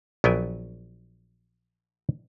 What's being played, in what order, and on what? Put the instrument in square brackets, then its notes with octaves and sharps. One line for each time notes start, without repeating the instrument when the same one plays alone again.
[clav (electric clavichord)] A#1 F#3 B3 A#4 G5 G#5